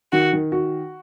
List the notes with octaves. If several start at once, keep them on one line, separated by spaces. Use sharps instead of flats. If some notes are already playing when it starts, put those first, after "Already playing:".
D#3 F#4
D#3
F#4